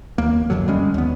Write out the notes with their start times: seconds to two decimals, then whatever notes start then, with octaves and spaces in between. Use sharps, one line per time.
0.18 D#2 A#3
0.50 G1 F#2 D3 F#3
0.68 G3 G#3 C#4
0.94 D#2 B3